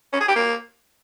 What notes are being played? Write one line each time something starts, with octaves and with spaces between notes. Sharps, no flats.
C#4
G#4
G4
A#3